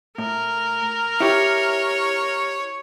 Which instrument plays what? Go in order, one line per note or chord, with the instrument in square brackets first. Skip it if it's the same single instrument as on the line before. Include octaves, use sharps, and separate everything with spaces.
[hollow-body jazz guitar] A2 [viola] A#4
[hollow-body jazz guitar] E4 G4 [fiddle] C#5